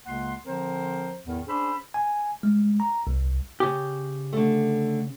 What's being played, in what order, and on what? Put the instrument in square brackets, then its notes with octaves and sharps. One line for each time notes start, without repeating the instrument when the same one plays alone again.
[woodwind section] C#2 C#3 A#3 F#5 C6
D3 F3 C4 A#4 C5
E2 A2 D#3
C#4 D4 G#4 C5 B5 E6
[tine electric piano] G#5
G#3
A#5
C2
[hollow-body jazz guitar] C#3 G4
[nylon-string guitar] D3 A3